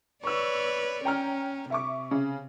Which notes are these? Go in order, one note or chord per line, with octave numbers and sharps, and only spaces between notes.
B4 C#5 D5 C#6 E6
C#4 G5 A#5 F6
C3 E5 C#6 D6
C#3